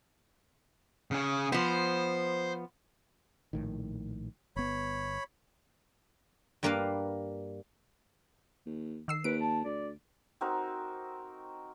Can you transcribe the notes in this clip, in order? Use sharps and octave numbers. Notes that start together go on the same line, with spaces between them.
C#3 G#4
F3 B3 C5
A#1 A2 D#3
G1 B3 C#5 B5
G2 G3 A#3 A#4 B4 F5
D#2
D#3 E6 C7
D#2 B4 D7
A5
D2 D5
C4 D#4 F#4 A#4